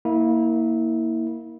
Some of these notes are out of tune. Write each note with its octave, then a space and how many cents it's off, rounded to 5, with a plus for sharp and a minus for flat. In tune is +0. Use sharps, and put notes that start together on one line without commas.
A#3 +0 E4 -25